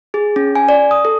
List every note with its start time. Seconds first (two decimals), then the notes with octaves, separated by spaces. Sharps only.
0.14 G#4
0.36 C#4
0.55 G#5
0.69 D5
0.91 D#6
1.05 A4